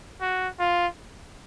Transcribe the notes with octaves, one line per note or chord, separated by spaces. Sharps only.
F#4
F4